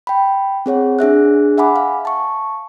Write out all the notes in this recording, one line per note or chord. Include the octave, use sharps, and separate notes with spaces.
G5 B5
C4 G#4 C#5 F#5
D4 G#4 E5 F#6
E5 F#5 G#5 B5 D6
F5
A5 C#6